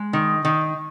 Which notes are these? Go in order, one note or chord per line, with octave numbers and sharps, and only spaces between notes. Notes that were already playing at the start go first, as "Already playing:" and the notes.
Already playing: G#3
D#3
D#3